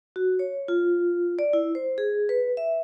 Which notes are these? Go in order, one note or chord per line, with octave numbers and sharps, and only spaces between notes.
F#4
C#5
F4
D5
E4
C5
G#4
B4
E5